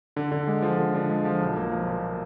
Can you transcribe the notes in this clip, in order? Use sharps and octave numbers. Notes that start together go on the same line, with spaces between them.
D3
D3
G#3
F3
D3
D3
G#3
F3
B1
A#3
F3
A#2